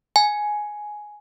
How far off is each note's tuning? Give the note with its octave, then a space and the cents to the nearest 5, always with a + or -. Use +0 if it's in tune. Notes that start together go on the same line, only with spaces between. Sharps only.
G#5 +10